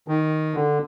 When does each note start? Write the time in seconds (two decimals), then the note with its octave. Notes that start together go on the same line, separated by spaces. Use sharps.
0.08 D#3
0.55 D3